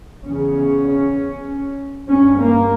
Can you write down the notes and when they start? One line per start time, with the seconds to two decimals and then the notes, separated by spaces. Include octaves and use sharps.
0.23 E2 C#3 C#4
2.08 G2 C#4
2.39 A#3